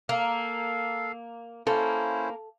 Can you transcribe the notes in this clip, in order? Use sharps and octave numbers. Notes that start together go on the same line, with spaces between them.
A#3 A4 F5
A#3 C#4 E4 A4 C5